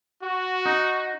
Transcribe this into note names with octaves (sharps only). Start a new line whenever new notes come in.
F#4
D#4